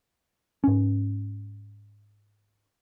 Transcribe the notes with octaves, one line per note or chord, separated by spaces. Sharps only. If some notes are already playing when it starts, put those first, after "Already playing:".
G#2 C#4